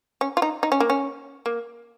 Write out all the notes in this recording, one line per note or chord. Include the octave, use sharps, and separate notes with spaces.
C#4
F4
D#4
D#4
C#4
A#3
C#4
A#3